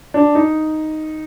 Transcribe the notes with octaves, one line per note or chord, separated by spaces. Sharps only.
D4
D#4